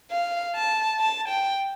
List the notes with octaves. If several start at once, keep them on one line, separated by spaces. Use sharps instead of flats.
F5
A5
A5
G5